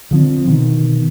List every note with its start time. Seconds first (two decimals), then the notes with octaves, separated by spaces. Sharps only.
0.11 D3 F3 C4
0.47 B2 D#3